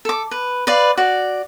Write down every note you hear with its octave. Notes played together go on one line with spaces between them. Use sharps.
A4 D6
B4
B4 D5 F5
F#4 D5